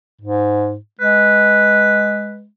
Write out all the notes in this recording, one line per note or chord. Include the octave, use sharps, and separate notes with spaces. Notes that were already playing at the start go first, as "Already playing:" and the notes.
G#2
G#3 B4